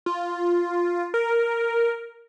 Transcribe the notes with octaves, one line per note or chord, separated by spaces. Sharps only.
F4
A#4